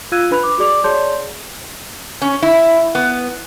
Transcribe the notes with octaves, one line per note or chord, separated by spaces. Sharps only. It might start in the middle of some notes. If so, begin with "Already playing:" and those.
F4 F5 E6 F#6 G#6 D#7
D4 B4 B5 F#6 F7
D6
F#4 G#4 D5 D6 F7
G#4 C#5 D5 A5 C6 G6
C#4
E4
B3